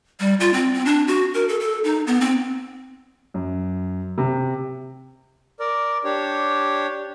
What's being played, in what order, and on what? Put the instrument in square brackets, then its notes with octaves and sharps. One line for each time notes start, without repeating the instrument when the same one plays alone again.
[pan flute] G3
F4
C4
C4
D4
F#4
A#4
A4
A4
D#4
B3
C4
[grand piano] F#2
C3
[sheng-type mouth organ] A#4 D5
D4 G4 C#5